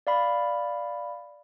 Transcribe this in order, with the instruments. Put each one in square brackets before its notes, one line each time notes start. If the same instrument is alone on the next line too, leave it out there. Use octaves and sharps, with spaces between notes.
[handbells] D5 F5 B5